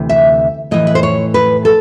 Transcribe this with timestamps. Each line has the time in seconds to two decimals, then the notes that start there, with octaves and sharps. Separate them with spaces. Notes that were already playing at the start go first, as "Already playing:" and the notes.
Already playing: D2 C3 E3
0.09 E5
0.71 A2 E3 D#5
0.87 B4
0.95 C5
1.03 C#5
1.34 B4
1.65 A4